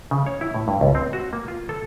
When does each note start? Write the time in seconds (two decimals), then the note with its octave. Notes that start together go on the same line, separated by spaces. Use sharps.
0.11 C#3
0.26 C#5
0.41 E4
0.54 A2
0.68 G2
0.81 C#2
0.95 C4
1.13 F#4
1.33 A#3
1.48 F4
1.69 A4